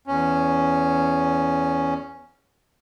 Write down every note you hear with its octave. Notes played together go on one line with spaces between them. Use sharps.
E2 C#4